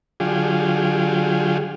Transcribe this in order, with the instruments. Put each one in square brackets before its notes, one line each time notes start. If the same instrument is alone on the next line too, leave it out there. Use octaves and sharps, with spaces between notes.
[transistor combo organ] D3 F#3 F4 G4 G#4